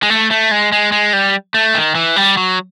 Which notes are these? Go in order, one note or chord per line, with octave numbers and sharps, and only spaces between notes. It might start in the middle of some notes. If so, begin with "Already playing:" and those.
G#3
A3
A3
G#3
G#3
G#3
G3
A3
D#3
E3
G3
F#3